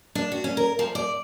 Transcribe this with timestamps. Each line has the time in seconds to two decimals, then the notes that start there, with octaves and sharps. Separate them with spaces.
0.15 D4
0.32 F#4
0.44 C#4
0.57 A#4
0.79 F3
0.95 D5